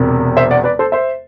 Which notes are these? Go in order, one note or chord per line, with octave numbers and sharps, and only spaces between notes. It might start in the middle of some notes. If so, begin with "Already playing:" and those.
Already playing: E1 E2 C3
C5 E5
D5 F#5
B4 D5
A4 C5
C5 E5